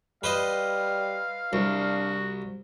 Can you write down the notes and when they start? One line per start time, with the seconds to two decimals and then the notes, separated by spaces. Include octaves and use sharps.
0.24 G3 B4 C5 D#5 F5
1.53 C2 D4 F#4